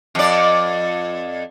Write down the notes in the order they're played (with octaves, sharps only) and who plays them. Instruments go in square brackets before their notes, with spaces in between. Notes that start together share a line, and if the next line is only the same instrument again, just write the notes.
[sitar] F2 D5